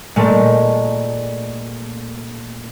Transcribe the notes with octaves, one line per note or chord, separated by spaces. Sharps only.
A#2 G#3 A3